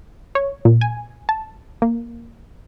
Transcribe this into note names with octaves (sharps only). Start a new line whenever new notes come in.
C#5
A#2
G#5
A5
A#3